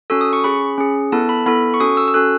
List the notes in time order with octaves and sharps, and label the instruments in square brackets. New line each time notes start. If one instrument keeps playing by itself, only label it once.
[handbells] C#4 F#4 A4 E6
D#6
C#6
C#4 G#4 B5
C#4 G#4
B3 E4 A4 A5
B5
B3 E4 A4 B5
C#6
C#4 F#4 A4 D#6
E6
E6
C#4 F#4 A4 F#6